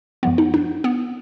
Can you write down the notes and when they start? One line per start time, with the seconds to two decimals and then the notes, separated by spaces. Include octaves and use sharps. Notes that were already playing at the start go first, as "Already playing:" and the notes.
0.23 F#2 F3 G#3 B3
0.38 D#4
0.54 D4
0.84 B3